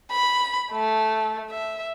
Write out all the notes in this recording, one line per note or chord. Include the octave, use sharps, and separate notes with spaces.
B5
A3
E5